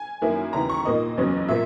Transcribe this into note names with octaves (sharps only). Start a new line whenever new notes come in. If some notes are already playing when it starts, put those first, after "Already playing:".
Already playing: G#5
F#2 D#3 A#3 E4
D#2 C#3 E3 A#5
C#6
A#2 A#3 D#4 D#5
F#1 E2 C#3 F#3 C#4
A#2 A#3 E5